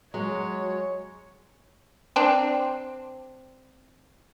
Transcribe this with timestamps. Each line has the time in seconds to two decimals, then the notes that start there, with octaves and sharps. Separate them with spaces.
0.14 F#3 G#3 C#5
2.16 C4 D4